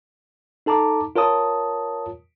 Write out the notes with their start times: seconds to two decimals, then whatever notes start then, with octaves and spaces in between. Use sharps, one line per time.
0.66 D#4 A4 A5 A#5 D6
1.16 F4 A#4 C#5 A5 D#6